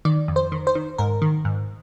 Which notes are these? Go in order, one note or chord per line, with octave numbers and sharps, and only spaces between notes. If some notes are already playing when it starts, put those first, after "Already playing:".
D#3 D5
F2
C5
D#3
C5
D#3
G#2 A#4
D#3
G#2